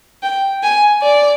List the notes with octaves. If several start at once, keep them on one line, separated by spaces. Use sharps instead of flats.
G5
G#5
D5